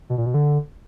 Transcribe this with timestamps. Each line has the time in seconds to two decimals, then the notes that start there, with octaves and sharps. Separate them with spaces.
0.10 B2
0.18 A#2
0.26 B2
0.34 D3